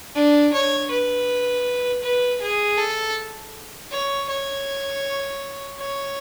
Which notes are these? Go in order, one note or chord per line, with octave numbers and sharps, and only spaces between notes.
D4
C#5
B4
B4
G#4
A4
C#5
C#5
C#5